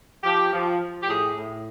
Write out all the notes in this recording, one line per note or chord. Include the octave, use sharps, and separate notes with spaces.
F3 G4
F3
F3
G4
A2 G#4
A2